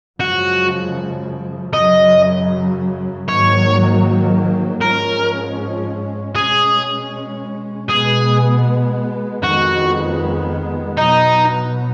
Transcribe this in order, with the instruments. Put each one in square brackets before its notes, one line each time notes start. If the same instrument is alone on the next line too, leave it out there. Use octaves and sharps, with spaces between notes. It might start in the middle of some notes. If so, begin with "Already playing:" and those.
[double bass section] F#2 C#3 F3 G#3 [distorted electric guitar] F#4
[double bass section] F#2 C#3 F#3 [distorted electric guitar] D#5
[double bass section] G#2 D#3 F#3 A#3 [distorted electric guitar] C#5
[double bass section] G#2 F3 G#3 C#4 [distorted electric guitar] A#4
[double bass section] B2 G#3 C#4 [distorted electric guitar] G#4
[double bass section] B2 G#3 B3 [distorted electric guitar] G#4
[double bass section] F2 D#3 G#3 B3 [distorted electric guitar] F#4
[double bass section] B2 F#3 B3 [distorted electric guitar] D#4